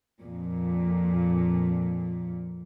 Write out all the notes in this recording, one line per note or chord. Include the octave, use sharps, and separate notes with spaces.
F2 A#2